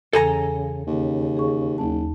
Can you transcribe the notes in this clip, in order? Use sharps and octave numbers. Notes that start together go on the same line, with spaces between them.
E2 C#3 E3 A4 G#5 A#5
D#2 C#3
G#4 C#6
F#1 D#2 D#4 A5